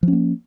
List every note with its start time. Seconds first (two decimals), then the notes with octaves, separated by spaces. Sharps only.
0.03 F3
0.08 C#4
0.13 A#3